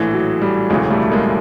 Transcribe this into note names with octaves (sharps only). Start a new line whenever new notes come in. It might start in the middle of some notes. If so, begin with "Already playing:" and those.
Already playing: A#1 A2 E3
F#3
G3
E1 D2 C#3 E3 F#3 G#3
G3 A3
A3
G#3 A#3